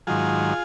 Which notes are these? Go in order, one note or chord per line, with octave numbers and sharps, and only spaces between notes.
G#2 D#3 F#3 F4 G#4